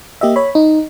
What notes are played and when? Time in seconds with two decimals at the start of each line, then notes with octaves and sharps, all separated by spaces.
0.21 A#3 G4 D#5 E5
0.36 C#5 B5
0.55 D#4